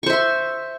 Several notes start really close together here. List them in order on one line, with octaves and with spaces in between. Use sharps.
C#6 C5 E5 C6